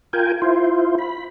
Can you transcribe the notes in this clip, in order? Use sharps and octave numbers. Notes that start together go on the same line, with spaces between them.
F4 A#4 G5 G#5
E4 F4 C5
B5